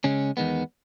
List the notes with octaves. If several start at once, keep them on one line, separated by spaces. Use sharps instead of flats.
C#3 G#3 C#4
E2 D#3 G#3 B3